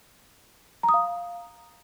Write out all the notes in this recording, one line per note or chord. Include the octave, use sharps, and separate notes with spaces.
A#5
D#6
F5